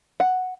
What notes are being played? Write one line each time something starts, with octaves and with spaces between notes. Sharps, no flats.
F#5